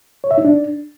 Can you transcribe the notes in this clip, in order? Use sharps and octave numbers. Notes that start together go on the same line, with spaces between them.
C#5
E5
D#4
D4